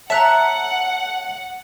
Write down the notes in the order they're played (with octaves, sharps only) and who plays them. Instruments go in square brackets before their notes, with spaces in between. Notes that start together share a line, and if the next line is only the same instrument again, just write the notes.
[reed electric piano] C#5 A5 [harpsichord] E5 [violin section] F#5 [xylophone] A#5 F#6 B6